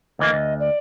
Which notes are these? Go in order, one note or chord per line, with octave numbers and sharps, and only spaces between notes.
D2 E3 A#3 D#5
D2
D5